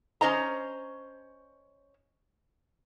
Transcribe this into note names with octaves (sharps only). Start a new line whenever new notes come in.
C#4 C5 D#5 A#5